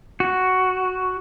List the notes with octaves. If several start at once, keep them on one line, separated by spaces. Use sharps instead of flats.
F#4